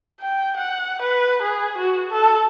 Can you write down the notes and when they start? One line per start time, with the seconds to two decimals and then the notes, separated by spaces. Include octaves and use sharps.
0.21 G5
0.57 F#5
1.02 B4
1.42 G#4
1.78 F#4
2.12 A4